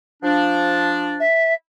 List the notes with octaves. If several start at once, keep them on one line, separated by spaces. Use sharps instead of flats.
F3 D4
E5